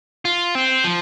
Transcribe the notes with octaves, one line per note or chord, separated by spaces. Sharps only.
F4
C4
F3